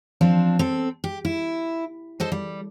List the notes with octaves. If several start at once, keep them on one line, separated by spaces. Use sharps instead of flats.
F3 C4 D4
C4 A4
G4
E4
A4 C5 D#5
G3